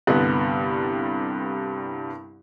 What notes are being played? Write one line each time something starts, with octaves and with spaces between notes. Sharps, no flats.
C2 G2 D3 B3